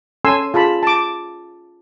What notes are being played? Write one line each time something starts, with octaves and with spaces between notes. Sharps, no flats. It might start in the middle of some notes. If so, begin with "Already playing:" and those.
C#4 A4 G#5 C6 E6
F4 G#4 A5 B5
A5 D6